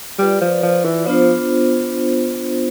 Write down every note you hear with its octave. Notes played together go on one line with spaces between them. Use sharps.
G3 F4 B4 D5
F3
F3
E3
F3 B3 D4 F4 C5